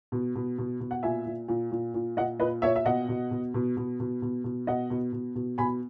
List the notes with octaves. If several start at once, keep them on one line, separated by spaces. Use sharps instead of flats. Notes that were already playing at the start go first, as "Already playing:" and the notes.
B2
B2
B2
B2
F#5
A#2 E5 G#5
A#2
A#2
A#2
A#2
A#2 D#5 F#5
A#2 B4 D#5
A#2 C#5 E5
E5
B2 D#5 F#5
B2
B2
B2
B2
B2
B2
B2
B2 D#5 F#5
B2
B2
B2
B2 G#5 B5